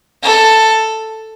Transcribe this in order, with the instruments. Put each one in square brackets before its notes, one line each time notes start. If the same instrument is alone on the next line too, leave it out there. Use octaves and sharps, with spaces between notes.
[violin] A4